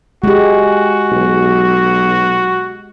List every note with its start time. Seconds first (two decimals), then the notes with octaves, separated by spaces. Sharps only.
0.24 G#3 F#4 G4
1.12 B1